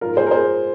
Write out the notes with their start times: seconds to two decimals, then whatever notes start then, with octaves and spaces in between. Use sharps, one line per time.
0.01 G#2 F3 F4 A#4
0.17 G#4 C5
0.27 A#4
0.31 G#4 C5